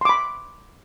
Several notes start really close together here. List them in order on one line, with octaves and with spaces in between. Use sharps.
C6 D6 B5